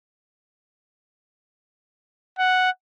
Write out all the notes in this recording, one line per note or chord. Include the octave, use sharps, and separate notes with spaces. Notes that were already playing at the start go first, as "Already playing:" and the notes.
F#5